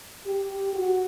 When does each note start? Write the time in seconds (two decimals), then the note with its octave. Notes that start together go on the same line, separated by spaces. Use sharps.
0.25 G4
0.75 F#4